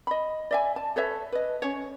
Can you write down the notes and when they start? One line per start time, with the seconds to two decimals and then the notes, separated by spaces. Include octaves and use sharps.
0.07 D#5 B5
0.51 D5 E5 G#5
0.76 A5
0.96 A4 B4 C#5 E5
1.32 B4 D#5
1.62 C#4 C#5